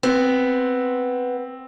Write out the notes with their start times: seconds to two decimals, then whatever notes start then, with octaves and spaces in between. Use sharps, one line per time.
0.03 B3 C4